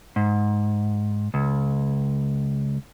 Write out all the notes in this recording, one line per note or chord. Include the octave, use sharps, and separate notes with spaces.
G#2
C#2